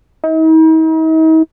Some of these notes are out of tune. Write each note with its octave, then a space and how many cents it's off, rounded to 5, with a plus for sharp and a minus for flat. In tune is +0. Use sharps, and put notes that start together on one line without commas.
D#4 +45